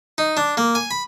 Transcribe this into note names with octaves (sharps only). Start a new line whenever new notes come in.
D#4
D4
A#3
G#5
B5